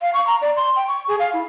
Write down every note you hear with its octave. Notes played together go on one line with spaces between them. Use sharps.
F5
C#6
A#5
D5
C6
G5
C#6
G#4
F5
E4